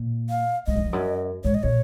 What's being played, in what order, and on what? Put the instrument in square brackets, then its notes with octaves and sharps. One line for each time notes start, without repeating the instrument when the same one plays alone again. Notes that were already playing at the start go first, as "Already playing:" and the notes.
Already playing: [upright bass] A#2
[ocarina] F5
[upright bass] G#2 [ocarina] D#5
[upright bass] F#2
F2
F#2
[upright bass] G#2 [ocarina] C#5
[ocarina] D#5
[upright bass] A#2 [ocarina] C#5